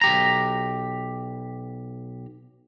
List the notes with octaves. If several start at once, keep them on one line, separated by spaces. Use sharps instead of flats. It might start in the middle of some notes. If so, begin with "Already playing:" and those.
B1 G4 A#5